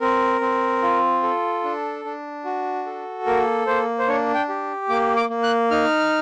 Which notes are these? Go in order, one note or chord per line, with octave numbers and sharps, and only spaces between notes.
C4 A#4
C4
F4
A4
D4
D4
F#4
A4
A#3 A#4
A#3 C5
C5
D4 C#5
G5
G4
A#3 D6
D6
A#3
F#6
D#4 F6